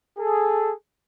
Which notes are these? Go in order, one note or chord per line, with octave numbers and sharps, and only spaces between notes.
G#4 A4